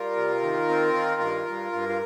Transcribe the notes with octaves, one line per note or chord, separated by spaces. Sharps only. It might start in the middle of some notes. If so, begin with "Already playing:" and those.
Already playing: G3 F4 A#4
C3
D#3
C4
D#3
G2
G2
G2
F4